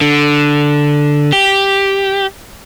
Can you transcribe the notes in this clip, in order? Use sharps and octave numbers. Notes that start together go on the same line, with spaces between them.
D3
G4